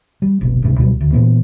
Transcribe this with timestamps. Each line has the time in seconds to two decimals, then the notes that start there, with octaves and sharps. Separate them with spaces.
0.22 G3
0.41 F1 B1 B2
0.62 C#2 G#2 C3
0.78 C#2 B2 F#3 G3
1.01 D2
1.13 A#2 E3 B3